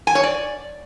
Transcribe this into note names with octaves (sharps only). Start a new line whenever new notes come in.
G#5
C#5
D5